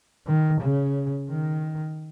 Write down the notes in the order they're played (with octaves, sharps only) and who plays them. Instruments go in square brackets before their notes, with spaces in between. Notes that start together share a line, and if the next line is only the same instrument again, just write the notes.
[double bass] D#3
C#3
D#3